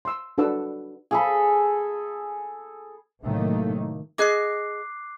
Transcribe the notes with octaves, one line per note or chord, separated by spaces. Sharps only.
C6 E6
D4 F#4 A4 B4 F#5 E6
G#4 A4 B5
A2 C3 D#3 F#3 A3 A#3
G#4 D#5 D6 F#6 C7